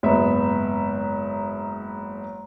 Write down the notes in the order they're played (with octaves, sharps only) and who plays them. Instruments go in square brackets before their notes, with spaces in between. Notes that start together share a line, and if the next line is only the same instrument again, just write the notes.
[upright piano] F#1 G#2 B3 E5 B5